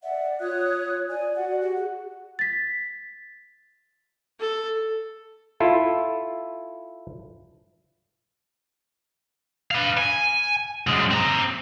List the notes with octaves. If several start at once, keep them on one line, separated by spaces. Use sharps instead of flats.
D5 E5 F#5
F4 C#5 D#6 F#6
D5 G#5
F#4 F#5
G4
G#4
A6 B6
A4
E4 F4 A4
B4 F5
G#5
F#2 G#3
C4 A#5